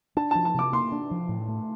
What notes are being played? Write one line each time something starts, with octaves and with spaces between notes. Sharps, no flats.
D4 A5
F3 A5
A5
C3 D6
A#3 C6
D4
F3
A2
A3